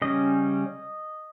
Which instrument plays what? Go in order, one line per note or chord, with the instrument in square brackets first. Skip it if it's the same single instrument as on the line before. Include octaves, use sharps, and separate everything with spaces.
[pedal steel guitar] C#3 G3 C#4 D#5